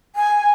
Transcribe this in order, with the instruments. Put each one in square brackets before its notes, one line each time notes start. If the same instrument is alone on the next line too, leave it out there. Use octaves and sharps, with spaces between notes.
[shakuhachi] G#5